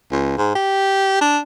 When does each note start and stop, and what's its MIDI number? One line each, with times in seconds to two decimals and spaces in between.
0.12 0.37 37
0.38 0.51 44
0.55 1.20 67
1.21 1.39 62